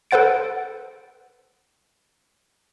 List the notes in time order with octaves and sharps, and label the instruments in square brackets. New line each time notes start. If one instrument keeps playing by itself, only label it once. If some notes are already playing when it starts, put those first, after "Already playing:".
[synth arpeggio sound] A4 B4 C5 F#5 A6 D7